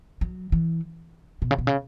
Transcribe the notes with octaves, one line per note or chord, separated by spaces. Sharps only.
F#3
E3
B2
C#3
B2
C#3